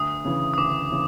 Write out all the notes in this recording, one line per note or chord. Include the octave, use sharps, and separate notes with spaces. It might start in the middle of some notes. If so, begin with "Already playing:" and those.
Already playing: D2 D#6
C#3 E3
D#6
D2 D6
C#3 E3